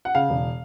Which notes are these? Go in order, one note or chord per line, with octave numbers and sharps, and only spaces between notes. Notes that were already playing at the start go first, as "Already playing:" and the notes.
F#5
C#3 F5
E1